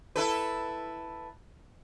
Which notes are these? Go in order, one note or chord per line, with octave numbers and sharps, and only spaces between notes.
E4 A4 B4